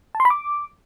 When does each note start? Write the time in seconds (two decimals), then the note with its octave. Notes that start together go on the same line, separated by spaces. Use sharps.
0.15 A5
0.20 C6
0.25 B5
0.30 D6